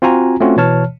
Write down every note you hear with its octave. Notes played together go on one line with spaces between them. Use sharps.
C4 F4 F#4 G#5 A#5
A3 C4 C#4 F4 F#4
B2 E3 C#5 A5 F6